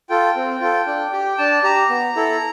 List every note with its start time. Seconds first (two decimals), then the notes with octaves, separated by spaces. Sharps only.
0.09 F4 A4 G5
0.35 C4
0.61 F4 A4
0.86 D4
1.13 G4
1.38 D4 A5
1.63 G4 A#5
1.89 B3
2.16 E4 A4